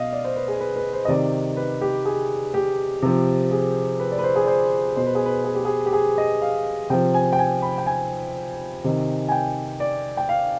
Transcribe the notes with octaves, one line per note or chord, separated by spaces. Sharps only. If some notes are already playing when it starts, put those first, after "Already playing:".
Already playing: B2 D#5 F5
D5
C5
B4
G#4
B4
B4
C5
D#5
C3 D#3 D5
B4
G4
G#4
G4
C3 F3
G#4
B4
D5
B4
C5
G#4
D5
C5
B2 C5
B4
G#4
B4
G#4
G4
G#4
G4
G#4
D#5
F5
C3 F3 G5
G#5
G5
G#5
B5
G5
G#5
C3 D#3
G#5
G5
D5
G5
F5